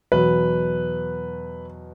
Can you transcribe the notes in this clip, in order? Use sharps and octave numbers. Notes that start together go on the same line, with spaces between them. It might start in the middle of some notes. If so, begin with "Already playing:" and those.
E2 B2 F#3 B4